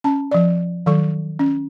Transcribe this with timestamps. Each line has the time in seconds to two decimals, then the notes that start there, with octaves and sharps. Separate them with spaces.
0.04 C#4 A5
0.31 F3 D5
0.86 D#3 F#3 A4 C#6
1.39 C#4